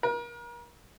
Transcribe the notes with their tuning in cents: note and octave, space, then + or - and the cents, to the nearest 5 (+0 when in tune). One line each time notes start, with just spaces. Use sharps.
A#4 +35